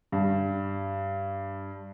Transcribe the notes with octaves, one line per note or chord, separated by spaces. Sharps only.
G2